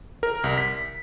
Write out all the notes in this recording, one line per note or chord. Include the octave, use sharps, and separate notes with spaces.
A#4
C2
B6